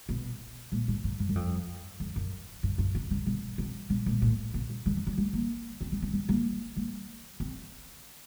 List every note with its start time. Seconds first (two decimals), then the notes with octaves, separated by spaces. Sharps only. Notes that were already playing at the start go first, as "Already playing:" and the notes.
0.09 B2
0.72 A#2
0.88 A2
1.04 G#2
1.20 G2
1.29 F#2
1.35 F2
2.00 F2
2.16 F#2
2.63 G2
2.78 G2
2.95 C3
3.10 C#3
3.26 B2
3.58 C3
3.90 B2
4.06 A#2
4.22 A2
4.54 B2
4.70 C#3
4.86 D3
4.97 D#3
5.07 G3
5.18 A3
5.33 A#3
5.81 C4
5.92 C4
6.02 C4
6.13 B3
6.29 A#3
6.76 A#3
7.40 C4